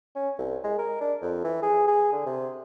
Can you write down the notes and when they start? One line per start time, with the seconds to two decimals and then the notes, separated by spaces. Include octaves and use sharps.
0.16 C#4
0.38 C2
0.64 G#3
0.78 A#4
1.01 D4
1.22 F2
1.44 E3
1.63 G#4
1.88 G#4
2.12 D3
2.26 C3